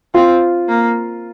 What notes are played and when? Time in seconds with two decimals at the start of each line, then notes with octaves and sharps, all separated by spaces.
0.14 C4 F4
0.69 A#3